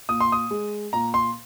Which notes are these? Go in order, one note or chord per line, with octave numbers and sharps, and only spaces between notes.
A#2 D#6
C6
D#6
G#3
A#2 A#5
C6